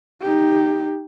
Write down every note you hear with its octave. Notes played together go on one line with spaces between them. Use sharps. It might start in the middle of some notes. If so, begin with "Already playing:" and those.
D#4 G4